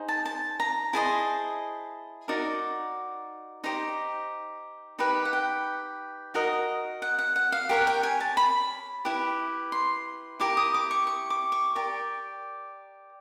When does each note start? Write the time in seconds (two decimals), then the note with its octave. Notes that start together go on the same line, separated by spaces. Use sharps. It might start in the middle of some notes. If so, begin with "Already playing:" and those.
Already playing: D#4 G#4 C5
0.08 A5
0.25 A5
0.60 A#5
0.93 E4 G#4 C5 D#5 A5
2.28 D#4 F#4 A#4 D5
3.64 D#4 G4 C5 A#5
4.99 D#4 G4 B4 B5
5.25 F#5
5.33 G5
6.34 D#4 F#4 A#4 D#5
7.02 F#5
7.19 F#5
7.36 F#5
7.52 F5
7.69 G4 A#4 C#5 F#5
7.87 G5
8.03 G#5
8.20 A5
8.37 B5
9.05 E4 G4 B4
9.72 C6
10.40 E4 G4 A#4 D6
10.57 D#6
10.74 D6
10.91 C#6
11.07 C#6
11.30 D6
11.52 C#6
11.75 G4 A#4 D5